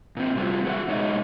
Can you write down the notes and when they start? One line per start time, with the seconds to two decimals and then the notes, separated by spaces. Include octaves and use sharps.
0.17 A#2 C4
0.36 C3 F#3 G3 F4 F#4
0.65 F#4 G#4 B4 D#5 E5 F#5
0.88 B2 G#3 D#4 C#5 D#5